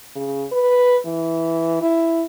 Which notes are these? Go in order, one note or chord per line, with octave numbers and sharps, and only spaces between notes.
C#3
B4
E3
E4